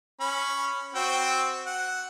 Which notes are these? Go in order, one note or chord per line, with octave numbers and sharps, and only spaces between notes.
C#4 B5
C4 F#4 G5
F#5